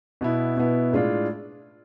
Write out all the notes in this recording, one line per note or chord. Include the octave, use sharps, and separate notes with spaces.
B2 B3 E4
B2 B3 E4
A2 G#3 D4 F4